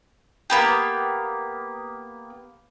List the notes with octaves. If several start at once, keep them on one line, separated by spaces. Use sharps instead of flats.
A#3 B3 G4